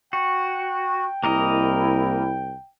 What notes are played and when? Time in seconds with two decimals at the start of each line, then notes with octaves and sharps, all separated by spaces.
0.13 F#4 G5
1.23 C2 A#3 E4 A#4 D#5